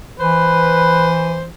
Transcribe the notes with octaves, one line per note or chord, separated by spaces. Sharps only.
E3 B4 C5